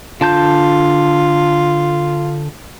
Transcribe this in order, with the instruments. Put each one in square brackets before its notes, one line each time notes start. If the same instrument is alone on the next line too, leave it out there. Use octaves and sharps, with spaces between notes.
[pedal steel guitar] D3 A5 G6 [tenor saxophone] F4